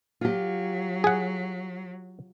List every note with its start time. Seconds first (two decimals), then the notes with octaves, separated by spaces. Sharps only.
0.21 F#3 F4 G4
1.04 G#4 F#5